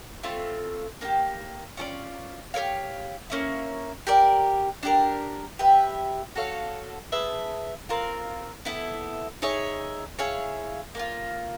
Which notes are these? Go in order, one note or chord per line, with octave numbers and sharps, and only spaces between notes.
A3 C4 F4
A#3 D4 G4
C#4 F4 A4 D5
G4 A#4 C#5 F5
A#3 C#4 E4
G4 A#4 D5
D4 G4 A#4
G4 B4 E5
F#4 A4 C#5 F5
G#4 B4 E5 A5
C4 F4 A#4
B3 E4 A4
D#4 G#4 C#5 E5
E4 G#4 C#5 F5
A#3 D4 F4